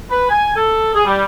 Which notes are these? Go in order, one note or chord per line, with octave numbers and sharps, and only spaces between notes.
B4
G#5
A4
G#4
G3